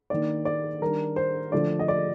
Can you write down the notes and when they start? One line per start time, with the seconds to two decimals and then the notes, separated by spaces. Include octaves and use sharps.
0.10 D#3 A#3 D4 D5
0.45 D5
0.81 D#3 G3 D4 A#4
1.16 C5
1.52 D3 F3 A3 D4 D5
1.79 D#5
1.88 D5